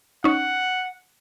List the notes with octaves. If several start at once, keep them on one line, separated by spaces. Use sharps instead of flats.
C#4 D#4 F#5